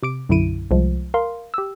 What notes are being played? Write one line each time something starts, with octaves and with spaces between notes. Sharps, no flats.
C3 D6 D7
B1 F#2 D3 E4 D7 D#7
C2 F3 G#3
A#4 F5 C6
G4 E6